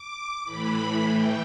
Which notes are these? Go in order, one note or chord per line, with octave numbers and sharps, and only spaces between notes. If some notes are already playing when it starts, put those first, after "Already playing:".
Already playing: D6
A2 E3 B5
G5